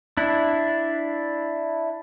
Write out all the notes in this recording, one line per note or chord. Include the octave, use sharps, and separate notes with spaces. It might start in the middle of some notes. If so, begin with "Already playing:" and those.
D4 E4